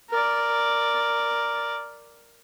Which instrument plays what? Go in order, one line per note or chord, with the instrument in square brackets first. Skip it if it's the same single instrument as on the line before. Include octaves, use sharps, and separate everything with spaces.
[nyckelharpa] A#4 D5